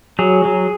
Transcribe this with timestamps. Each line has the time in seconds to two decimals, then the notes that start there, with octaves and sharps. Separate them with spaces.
0.19 F#3 G#4
0.45 F#3